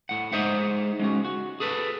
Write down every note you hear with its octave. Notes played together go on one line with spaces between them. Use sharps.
A2 F#5
G#3 D#4 G#4 C5 E5 F#5
G#3 C#4 F#4
F#4
G#4 A4 B4